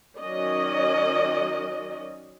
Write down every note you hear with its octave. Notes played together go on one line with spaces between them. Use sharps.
D#3 F#3 C#4 D5 D#5